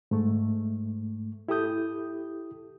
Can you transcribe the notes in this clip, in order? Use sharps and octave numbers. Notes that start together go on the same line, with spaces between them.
G#2 A3
E4 G4 A4 D#6 G6